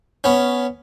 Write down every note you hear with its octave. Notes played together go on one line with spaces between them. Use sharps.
B3 C#4